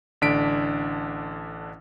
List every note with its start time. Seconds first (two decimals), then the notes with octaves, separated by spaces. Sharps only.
0.21 A1 D3 D4 B6 D7